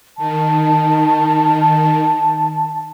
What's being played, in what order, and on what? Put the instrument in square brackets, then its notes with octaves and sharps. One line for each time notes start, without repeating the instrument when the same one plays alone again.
[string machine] D#3 [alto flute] A5